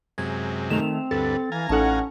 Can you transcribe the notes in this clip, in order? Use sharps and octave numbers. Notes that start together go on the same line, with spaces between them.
F#2 C3 G#3 G#6
D#3 A3 C4 E7 F7
D2 G2 A4 B4 A6
E3 F5 G#5 A#5
A1 C#4 D#4 A4 F#5 A5